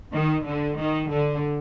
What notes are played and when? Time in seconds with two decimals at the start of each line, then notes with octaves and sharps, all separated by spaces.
0.13 D#3
0.46 D3
0.79 D#3
1.12 D3